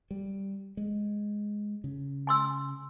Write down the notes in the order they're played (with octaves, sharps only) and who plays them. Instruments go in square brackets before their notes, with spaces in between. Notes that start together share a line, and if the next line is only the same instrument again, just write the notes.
[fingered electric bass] G3
G#3
C#3
[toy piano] G#5 C6 E6